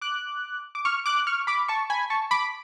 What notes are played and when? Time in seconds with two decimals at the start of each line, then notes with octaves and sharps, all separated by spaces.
0.01 D6 F#6
0.75 D6
0.85 C#6 F6
1.06 D6 F#6
1.27 C#6 F6
1.47 B5 D6
1.68 A5 C#6
1.90 G#5 B5
2.10 A5 C#6
2.31 B5 D6